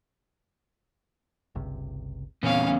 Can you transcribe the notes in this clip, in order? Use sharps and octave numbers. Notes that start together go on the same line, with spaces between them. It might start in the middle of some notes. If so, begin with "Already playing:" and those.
G1 C#2 C3
E2 A#2 C#3 C4 C#4 F5